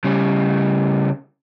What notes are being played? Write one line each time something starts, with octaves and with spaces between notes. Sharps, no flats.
C#3 G3